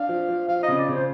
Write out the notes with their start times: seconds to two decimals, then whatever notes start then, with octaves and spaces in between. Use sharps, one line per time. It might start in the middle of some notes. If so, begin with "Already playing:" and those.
Already playing: D4 F5
0.09 F3
0.28 F3
0.48 F3 F5
0.63 D#5
0.68 C#3
0.78 D5
0.88 C#3 C5